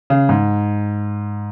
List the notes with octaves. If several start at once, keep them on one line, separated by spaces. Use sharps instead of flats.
C#3
G#2